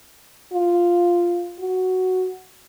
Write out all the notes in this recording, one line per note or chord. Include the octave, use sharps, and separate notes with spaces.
F4
F#4